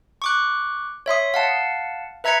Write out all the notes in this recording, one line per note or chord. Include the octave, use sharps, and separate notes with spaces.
C#6 D6 F#6
C#5 E5 C6 D#6
F5 F#5 A5
B4 E5 A#5 G#6 B6 C#7